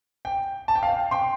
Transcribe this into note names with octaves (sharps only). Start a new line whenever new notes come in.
G5
A5
G5
F5
G5
G5 C6